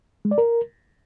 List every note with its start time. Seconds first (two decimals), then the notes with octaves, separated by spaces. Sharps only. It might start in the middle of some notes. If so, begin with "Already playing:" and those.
0.25 G#3
0.31 D5
0.38 A#4